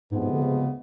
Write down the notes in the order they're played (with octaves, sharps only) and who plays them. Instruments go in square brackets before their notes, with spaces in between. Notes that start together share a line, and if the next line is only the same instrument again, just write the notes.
[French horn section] D2 C3 F3 G#3 B3 [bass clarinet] G#2
[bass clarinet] G#2
D3
C#3